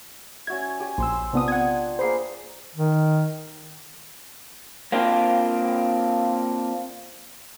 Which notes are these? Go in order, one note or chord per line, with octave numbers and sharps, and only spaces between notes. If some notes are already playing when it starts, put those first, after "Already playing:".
C#4 F#4 E5 G#6
G4 C#5 G#5
A#1 C5 G5 C6 E6
C3 B3 D4 F4 D#6
F#5 G#6
A#3 G#4 B4 C5 C7
D#3
A#3 C4 D4 F4